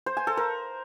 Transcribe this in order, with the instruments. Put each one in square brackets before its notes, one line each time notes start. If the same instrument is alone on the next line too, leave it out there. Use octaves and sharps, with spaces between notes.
[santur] C5
G#5
A4
A#4